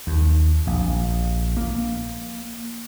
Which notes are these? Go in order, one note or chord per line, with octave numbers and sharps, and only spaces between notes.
D#2
A#1
A#3